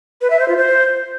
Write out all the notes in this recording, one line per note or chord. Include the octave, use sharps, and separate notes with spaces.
B4
E5
C5
F4
C5